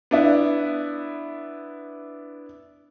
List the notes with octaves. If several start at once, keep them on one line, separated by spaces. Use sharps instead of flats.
B3 D4 E4